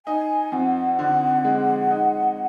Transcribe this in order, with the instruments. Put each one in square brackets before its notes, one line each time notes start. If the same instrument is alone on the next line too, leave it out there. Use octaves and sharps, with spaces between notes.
[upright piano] D#4 [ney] G#5
[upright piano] F2 [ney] F#5
[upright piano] D3
G#3
D#4